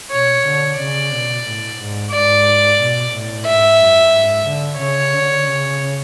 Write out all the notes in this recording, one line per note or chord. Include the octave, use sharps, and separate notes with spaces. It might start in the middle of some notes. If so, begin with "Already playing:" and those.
B2 C#5
D3
C#3 D5
B2
A2
G#2
G#2 D5
B2
A2
G#2 E5
F#2
G#2
D3
C#3 C#5
D3
C#3